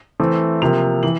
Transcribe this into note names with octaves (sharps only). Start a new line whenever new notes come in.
E3 A3 C4
C3 F3 A#3 F7
E3 F#7